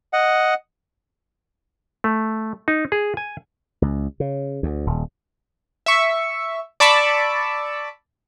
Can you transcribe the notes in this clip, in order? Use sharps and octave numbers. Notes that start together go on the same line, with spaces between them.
D#5 F#5
A3
D#4
G#4
G#5
C#2
C#3
D2
D#1
E5 C#6
D5 A5 B5 C#6 D6 E6